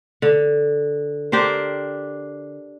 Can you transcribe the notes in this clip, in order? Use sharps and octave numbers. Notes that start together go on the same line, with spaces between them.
D3
D4 G4 A#4 C5